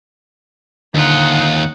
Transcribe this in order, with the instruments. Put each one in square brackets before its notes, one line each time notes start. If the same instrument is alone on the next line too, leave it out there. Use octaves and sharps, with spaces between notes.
[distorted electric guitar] D#2 F4 [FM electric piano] D3 [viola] D#4 F#5